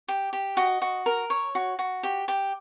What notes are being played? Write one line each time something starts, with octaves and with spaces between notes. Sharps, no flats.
G4
G4
F#4 D#5
F#4
A#4
C#5
F#4
F#4
G4
G4